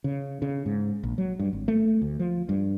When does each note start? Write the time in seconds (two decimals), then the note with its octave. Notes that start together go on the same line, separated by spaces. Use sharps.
0.04 C#3
0.42 C#3
0.66 G#2
1.03 A#1
1.18 F#3
1.39 G2
1.53 G#1
1.68 A3
2.02 D2
2.19 F3
2.49 G2